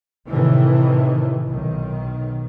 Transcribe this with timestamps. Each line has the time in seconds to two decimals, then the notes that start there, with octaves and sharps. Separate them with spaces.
0.29 A2 C3 D#3 E3
1.46 B1 D#3